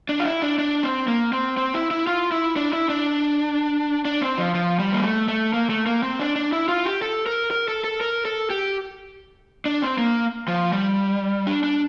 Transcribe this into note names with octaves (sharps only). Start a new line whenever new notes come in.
D4
F4
E4
D4
D4
C4
A#3
C4
C4
E4
E4
F4
E4
D4
E4
D4
D4
C4
F3
F3
G3
A#3
A3
A3
A#3
A3
A#3
C4
D4
D4
E4
F4
G4
A4
A#4
A#4
A4
A4
A#4
A4
G4
D4
C4
A#3
F3
G3
D4
D4